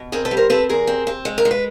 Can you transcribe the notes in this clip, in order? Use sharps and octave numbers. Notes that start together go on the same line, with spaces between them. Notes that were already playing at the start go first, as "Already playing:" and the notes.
Already playing: B2
C4 G#4 A#4
A4 B4
G3
A#4 C5
C4 A4 B4
E2 G#4 A#4
C4
C4
G#3
A#4
G#3
B4